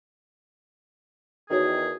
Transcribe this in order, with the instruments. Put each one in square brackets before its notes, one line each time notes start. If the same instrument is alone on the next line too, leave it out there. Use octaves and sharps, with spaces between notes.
[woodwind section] E2 D#3 G#4 [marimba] D#4 F#4 C#5